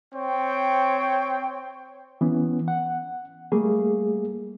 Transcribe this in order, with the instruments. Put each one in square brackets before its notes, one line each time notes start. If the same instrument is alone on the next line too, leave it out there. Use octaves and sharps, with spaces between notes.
[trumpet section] C4 C#5 G5
[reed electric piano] E3 B3 C#4
F#5
G3 A3 A#3 G#4